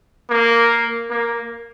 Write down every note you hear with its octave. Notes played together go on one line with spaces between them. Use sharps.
A#3
A#3